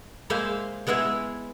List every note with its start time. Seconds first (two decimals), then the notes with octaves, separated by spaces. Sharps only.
0.30 G#3 A#3 G#4 C5 E5 F5
0.87 G#3 B3 E4 G#4 E5